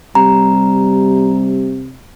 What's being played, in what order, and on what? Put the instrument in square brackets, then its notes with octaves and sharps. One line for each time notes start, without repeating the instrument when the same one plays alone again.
[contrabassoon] C3 [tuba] G3 [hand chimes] A#5